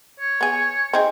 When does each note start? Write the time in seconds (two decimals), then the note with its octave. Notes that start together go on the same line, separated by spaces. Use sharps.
0.20 C#5
0.41 B3 G#4
0.93 C4 D#4 G#4